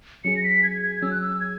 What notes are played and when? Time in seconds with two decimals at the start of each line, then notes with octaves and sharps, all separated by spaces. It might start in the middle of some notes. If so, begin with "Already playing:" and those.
0.24 F#3 C#4 G#4 C#7
0.37 A#6
0.44 B6
0.63 G#6
0.83 G#6
1.02 F#3 C#4 G#4 E6
1.11 F#6
1.21 E6
1.40 G#6